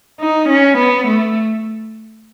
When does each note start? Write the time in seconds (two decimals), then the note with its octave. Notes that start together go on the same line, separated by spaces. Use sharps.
0.21 D#4
0.49 C#4
0.78 B3
1.07 A3